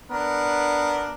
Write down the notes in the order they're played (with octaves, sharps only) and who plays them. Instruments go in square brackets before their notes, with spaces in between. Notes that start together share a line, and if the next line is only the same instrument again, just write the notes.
[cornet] B3 [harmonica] D4 A#4